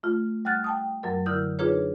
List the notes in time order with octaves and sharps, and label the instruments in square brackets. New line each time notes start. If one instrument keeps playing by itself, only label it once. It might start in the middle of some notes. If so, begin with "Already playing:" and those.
[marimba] A3 F4
G3 F#5 F6 F#6 A6
G5 A5 D#6
F#2 F#3 A#4
D3 E4 A#4 D#6 F6 G6
D4 D#4 F4 G#4 B4 C#5